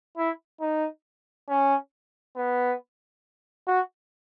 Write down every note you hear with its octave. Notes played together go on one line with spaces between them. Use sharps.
E4
D#4
C#4
B3
F#4